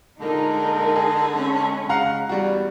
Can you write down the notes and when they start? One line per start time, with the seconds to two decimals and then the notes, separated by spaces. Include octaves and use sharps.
0.21 A#2 D3 G#3 D#4 A#4
0.96 G#4
1.34 G#3 C#4
1.89 C#3 F5 F#5 A#5
2.29 E2 G3 F#4